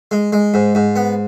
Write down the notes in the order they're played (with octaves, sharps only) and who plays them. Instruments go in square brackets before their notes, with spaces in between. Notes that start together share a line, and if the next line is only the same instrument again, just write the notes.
[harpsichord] G#3
G#3
G#2
G#2
B3